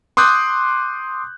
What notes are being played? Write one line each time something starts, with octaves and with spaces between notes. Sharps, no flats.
C6 D6 D#6 F#6 G6